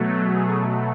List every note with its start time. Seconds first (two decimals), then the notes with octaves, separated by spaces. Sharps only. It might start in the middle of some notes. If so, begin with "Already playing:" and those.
Already playing: B2 F#3 A3
0.25 G#4